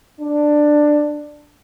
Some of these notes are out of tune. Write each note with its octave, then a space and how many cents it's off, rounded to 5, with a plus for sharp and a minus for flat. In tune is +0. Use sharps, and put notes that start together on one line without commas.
D4 +10